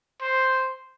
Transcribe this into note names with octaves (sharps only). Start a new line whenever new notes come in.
C5